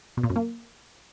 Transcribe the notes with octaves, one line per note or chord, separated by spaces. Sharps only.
B2
A#2
F#2
A#3